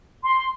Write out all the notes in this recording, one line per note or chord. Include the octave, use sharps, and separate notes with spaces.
C6